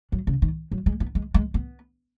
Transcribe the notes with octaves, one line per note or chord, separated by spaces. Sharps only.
F#3
C#3
D#3
F#3
G#3
B3
G#3
G#3
B3